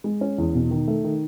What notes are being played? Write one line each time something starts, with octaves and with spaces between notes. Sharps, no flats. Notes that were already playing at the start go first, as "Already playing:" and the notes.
G#3
C#4
E2
B2
D#3
A3
D#3